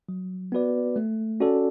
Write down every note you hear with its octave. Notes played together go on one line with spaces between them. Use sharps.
F#3
B3 F#4 B4 D5
A3
C#4 F#4 A4 D5